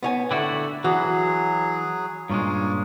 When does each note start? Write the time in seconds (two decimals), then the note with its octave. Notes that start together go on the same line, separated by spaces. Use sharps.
0.03 B3 C#5 G#5
0.31 D3 A3 E4 F#4 D5 G5
0.84 E3 F#3 F#4 G#4
2.30 G2 A#2 G#3 C#4 F4